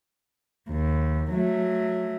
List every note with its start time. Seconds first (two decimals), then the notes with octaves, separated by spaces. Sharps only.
0.71 D#2
1.32 F#3 A3